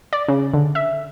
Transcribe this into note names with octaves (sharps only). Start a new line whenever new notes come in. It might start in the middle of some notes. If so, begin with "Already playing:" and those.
D5
C#3
D3
E5